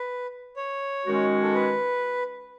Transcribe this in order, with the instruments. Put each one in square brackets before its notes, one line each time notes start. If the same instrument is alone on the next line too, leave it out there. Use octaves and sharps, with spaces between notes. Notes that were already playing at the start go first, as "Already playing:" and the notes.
Already playing: [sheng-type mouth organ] B4
C#5
[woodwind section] D#3 G#3 C#4 F#4
[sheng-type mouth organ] A4
B4